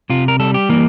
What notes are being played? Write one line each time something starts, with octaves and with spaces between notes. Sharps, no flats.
C3 F4
A#4
G3 A4
G4
E3 A#3